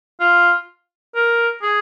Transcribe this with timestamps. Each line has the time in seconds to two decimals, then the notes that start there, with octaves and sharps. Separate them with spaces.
0.20 F4
1.15 A#4
1.62 G#4